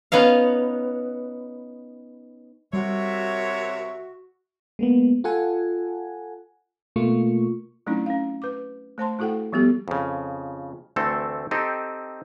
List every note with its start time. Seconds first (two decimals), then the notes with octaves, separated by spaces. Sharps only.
0.12 B3 C#4 D#4 F5
2.73 C3 G3 F#4 A#4 C#5 E5
4.79 G#3 A#3 B3
5.24 F4 A4 F#5 G#5
6.96 B2 A3 A#3 F4 C#6
7.86 F#3 A3 C4 C#4 D#4 E4
8.06 C#4 F5
8.42 B4 D6
8.98 A3 C5 A5 C6
9.19 A3 E4 F#4 A4 F#5 G5
9.52 F3 G3 B3 F#4 G4 A4
9.88 F2 C#3
10.96 D2 E3 A3 C4 A4
11.51 C4 D#4 G4 A4